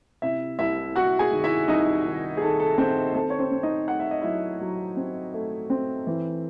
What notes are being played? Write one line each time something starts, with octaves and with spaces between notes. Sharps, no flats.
C3 E4 E5
C2 E4 E5
C2 F#4 F#5
G#4 G#5
D#3
E4 E5
C2 D#4 D#5
D#3
G#4
D#3 A4
A4
D#3 C4 C5
C4 A4
C#5
C4 C5
C4
D#4 D#5
A3 F#5
E5
D#5
F#3 E4 E5
F#3
C4
A3
C4
E3